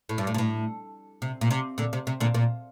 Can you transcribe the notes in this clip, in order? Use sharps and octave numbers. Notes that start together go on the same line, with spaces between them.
A2
G2
A2
A#2
A2
C3
A#2
C3
A#2 D3
C3
C3
A#2 D3
A#2